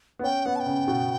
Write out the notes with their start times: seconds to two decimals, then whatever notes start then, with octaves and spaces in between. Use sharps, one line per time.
0.19 B3
0.23 C#4 G5
0.46 B3 F#5
0.56 A5
0.60 G5
0.66 C#3
0.88 B2